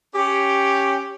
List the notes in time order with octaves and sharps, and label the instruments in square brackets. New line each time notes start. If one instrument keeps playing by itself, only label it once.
[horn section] C#4 G4